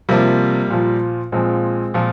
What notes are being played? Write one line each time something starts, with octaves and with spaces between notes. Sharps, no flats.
C3 F3 G3 A#3
A#2 F3
A#2 F3 G#3 C4
A#2 F3